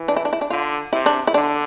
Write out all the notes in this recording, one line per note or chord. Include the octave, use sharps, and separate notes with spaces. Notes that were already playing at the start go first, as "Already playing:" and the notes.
Already playing: E3
D4
E4
D4
E4
D4
D3 F4
C3 E4
D4
E4
D3 D4